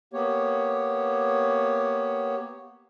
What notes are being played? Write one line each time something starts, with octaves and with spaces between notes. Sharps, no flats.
A#3 B3 G4 C#5